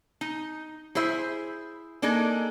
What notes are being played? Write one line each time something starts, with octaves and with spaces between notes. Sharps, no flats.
D#4
E4 G#4 C5 E5
A#3 D4 D#4 G#4 A4